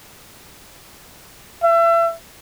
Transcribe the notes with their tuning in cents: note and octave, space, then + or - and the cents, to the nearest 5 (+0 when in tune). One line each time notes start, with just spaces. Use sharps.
E5 +35